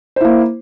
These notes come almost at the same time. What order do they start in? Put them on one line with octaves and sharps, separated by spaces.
C5 E4 A#3